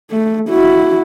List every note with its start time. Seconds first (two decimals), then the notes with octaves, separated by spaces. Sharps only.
0.11 A3
0.50 E4 F#4